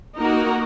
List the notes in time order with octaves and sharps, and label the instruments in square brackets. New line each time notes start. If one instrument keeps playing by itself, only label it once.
[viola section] A#3 D#4 F#4 A#4